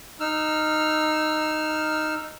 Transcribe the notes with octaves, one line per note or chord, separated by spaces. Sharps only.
D#4 E6 F6